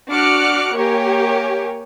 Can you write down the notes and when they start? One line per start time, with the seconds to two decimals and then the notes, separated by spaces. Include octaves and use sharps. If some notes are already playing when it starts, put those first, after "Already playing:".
0.11 D4 F#4 D6 F6 F#6 C#7
0.77 A#3 G4 A#4 C#5 G#5